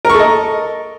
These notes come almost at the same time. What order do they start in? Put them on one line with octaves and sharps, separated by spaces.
A#4 C#6 A4 D#5